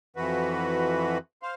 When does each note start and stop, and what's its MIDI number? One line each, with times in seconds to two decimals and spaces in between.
0.16 1.18 41
0.16 1.18 52
0.16 1.18 66
0.16 1.18 71
1.43 1.55 72
1.43 1.55 77